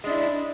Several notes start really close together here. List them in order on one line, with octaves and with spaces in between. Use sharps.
G#3 D4 E4